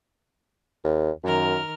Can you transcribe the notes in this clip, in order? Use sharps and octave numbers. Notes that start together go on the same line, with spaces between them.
D#2
F#2 D#3 A#4 F6